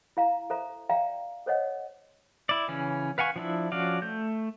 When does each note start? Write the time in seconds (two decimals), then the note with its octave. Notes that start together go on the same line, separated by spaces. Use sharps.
0.17 E4 F5 A#5
0.50 A4 C5 E5 A#5
0.89 D5 E5 F5 G5 A#5
1.46 A4 C5 C#5 D#5 F#5
2.49 E4 D5
2.68 C#3 E3 C#4
3.18 B4 F5 F#5 G#5 C#6
3.36 F3 D4 E4
3.72 F3 C#4 F#4 D5 F5
4.02 A3 G6